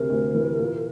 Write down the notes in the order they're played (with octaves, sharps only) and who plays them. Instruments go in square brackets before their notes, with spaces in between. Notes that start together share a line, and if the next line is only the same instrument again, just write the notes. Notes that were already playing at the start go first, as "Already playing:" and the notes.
Already playing: [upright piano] D2 C3 [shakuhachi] A#4
[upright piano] D2
E3
A#2